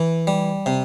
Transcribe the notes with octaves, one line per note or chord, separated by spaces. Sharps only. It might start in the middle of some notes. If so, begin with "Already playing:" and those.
Already playing: E3
G3
C3